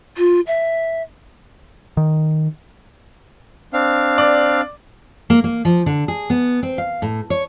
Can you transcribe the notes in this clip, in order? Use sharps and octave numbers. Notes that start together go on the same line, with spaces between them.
F4
E5
D#3
C4 D4 F5
D5
A#3
A#3
F3
D3
G#4
B3
C4
F5
A2
C#5